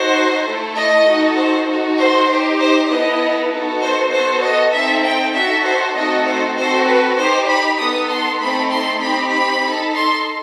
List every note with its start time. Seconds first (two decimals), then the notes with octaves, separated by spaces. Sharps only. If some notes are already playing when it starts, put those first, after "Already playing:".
Already playing: D#4 F#4 A4 C5
0.44 A3 E4 A4
0.75 D#5
1.06 D#4 F#4 A4
1.36 C5
1.67 D#4 F#4 A4
1.97 C5
2.28 D#4 G4
2.59 C5
2.89 B3 E4 A4 D#5
3.50 B3 D#4 F#4 A4
3.81 C5
4.12 B3 F#4 A4 C5
4.42 D#5
4.73 C4 D#4 A4 E5
5.03 G5
5.34 D#4 F#4 A4 E5
5.64 C5
5.95 A3 C4 D#4 F#4 A4 D#5
6.26 C5
6.57 C4 F#4 A4 C5
6.87 B4
7.18 D#4 G4 C5
7.48 B5
7.79 B3 D#4 A4 D#6
8.10 C6
8.40 A3 C4 D#4 A4 B5
8.71 C6
9.01 C4 D#4 G4 B5
9.32 B5
9.63 D#4 A4
9.93 C6